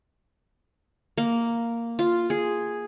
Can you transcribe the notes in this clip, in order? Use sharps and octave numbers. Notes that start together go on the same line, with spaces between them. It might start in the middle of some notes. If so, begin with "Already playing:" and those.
A#3
F4
G#4